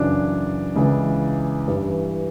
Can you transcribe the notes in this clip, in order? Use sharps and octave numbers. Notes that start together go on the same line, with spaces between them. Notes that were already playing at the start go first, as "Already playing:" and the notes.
Already playing: F#2 C#3 E3 D4
C#2 C#3 E3
G2 E3